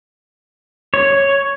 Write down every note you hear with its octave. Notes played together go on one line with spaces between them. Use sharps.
C#5